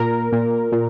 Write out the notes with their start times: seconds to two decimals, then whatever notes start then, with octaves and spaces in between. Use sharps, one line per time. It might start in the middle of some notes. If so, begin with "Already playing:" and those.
Already playing: A#2 A#4
0.32 A#2
0.72 A#2